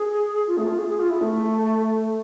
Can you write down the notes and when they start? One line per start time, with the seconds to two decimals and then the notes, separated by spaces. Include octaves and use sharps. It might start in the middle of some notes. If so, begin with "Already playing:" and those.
Already playing: G#4
0.47 F4
0.57 A3
0.68 F4
0.78 G#4
0.89 G#4
1.00 F4
1.10 E4
1.21 A3